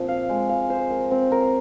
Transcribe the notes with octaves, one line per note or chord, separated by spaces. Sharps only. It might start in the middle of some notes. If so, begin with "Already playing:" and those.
Already playing: A#2 F3 C4
F5
G#3
F5
C5
A#4
C4
A#4